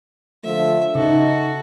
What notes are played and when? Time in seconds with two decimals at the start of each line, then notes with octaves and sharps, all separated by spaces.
0.44 D3 F3 A3 E5
0.95 C#3 D#4 F#4 A4